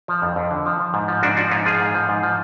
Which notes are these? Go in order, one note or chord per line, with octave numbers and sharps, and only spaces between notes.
F3
F2
F2
D3
F3
F3
G#2
F3
G#2 D4 F#4
F3 D4 F#4
G#2 C#4 F4
F3 F4 G#4
G#2
F3
G#2
F3